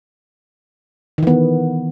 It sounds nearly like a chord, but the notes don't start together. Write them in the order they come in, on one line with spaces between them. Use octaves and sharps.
D#3 E3 B3